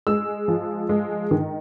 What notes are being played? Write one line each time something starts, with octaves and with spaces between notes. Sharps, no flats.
G#3 E6
F3
G#3
D#3